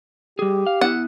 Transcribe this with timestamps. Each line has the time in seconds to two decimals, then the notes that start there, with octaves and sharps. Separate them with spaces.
0.39 G3 G4 G#4
0.67 F5
0.81 B3 E4 F#5